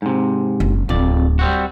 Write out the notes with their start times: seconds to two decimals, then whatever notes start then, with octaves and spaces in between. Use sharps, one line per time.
0.02 G#2 C3
0.60 F#1
0.89 D1 F2 D5
1.39 G3 C4 F#4